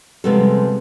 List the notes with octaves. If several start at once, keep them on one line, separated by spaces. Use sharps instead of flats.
C3 F3 G3 G#3 B3 A4